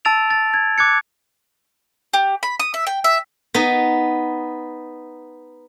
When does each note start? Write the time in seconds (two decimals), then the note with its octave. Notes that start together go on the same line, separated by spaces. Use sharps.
0.05 A5 E6 A6 D7 F7
0.30 A6
0.54 G#6
0.78 D6 F#6 G#6 C#7
2.13 G4
2.43 B5
2.60 D#6
2.74 E5
2.87 G5
3.04 E5
3.54 B3 D#4